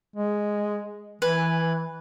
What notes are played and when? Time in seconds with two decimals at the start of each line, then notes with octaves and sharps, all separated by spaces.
0.16 G#3
1.22 E3 B4 G#5